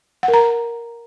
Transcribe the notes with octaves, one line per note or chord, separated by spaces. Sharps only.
F#5
A#4
A#5